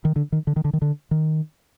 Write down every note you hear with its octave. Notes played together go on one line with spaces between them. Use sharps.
D#3
D3
D#3
D3
D#3
D3
D#3
D3
D#3